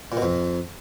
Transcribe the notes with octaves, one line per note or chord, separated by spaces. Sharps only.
A#2
B2
F2